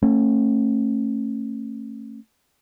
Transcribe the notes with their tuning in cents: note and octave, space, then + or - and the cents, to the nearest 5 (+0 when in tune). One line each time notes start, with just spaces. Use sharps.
A3 +25 C#4 -30